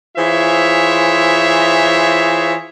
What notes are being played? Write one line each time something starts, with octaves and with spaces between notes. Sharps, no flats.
E3 F4 G#4 C5 C#5 E5